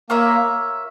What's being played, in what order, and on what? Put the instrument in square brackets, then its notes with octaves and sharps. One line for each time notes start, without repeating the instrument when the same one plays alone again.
[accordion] A#3 [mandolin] F4 A#4 C#5 E5